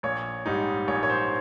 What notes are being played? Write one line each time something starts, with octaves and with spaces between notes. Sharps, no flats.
A#1 C#5
G#2 G3 D#4
A#1 C#5
C#5
C5